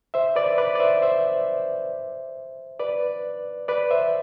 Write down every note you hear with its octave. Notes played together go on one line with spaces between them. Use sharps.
C5 E5
B4 D5
B4 D5
D5
C5 E5
C5 E5
B4 D5
B4 D5
C5 E5